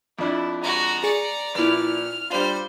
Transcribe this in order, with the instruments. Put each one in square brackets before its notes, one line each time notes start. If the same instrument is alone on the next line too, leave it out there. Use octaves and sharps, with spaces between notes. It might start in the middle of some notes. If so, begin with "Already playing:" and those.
[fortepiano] F2 F3 D4 [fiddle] E4
[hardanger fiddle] G#3 F#4 [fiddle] A#5
[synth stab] G#4 C#7 [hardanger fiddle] D5
[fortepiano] A#1 A#2 [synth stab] E4 B4 [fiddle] F6
[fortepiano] G3 D4 F4 [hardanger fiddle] C5